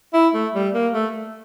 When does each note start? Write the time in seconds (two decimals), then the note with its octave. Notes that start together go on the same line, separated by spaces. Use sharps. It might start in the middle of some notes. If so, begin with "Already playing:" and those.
0.13 E4
0.34 A3
0.54 G3
0.74 A#3
0.93 A3